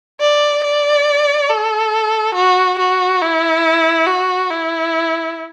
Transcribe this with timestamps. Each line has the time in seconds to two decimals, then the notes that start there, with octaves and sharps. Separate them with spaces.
0.21 D5
0.64 D5
1.50 A4
2.35 F#4
2.79 F#4
3.21 E4
4.07 F#4
4.51 E4